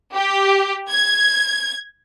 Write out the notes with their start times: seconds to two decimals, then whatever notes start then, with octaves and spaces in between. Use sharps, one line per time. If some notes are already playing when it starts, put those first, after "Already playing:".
0.14 G4
0.89 G#6